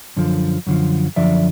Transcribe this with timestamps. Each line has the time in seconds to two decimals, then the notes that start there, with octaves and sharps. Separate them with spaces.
0.16 F#2 D3 F3
0.67 F#2 D3 F3
1.16 F#2 D3 F3 D5 E5